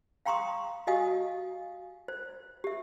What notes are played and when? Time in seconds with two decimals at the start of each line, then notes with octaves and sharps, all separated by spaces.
0.26 F5 G5 A#5 C6 C#6 D#6
0.87 F#4 G4 D#5 F5 G#5 D#6
2.08 C5
2.64 G4 E5